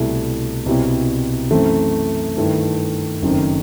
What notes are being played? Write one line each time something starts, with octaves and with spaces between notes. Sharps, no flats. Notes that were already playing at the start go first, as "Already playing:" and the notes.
Already playing: C2 B2 A3 E4 G4
C2 B2 G3 C4 E4
F#2 E3 A3 C4
G2 D#3 A3 E4
F#1 F#2 D#3 A3 C4